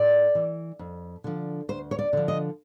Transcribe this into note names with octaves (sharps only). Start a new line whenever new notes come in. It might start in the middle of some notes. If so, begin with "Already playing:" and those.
Already playing: A2 D5
E3
F2
D3 F3
D2 C5
C#5
D5
D3 F3
D#5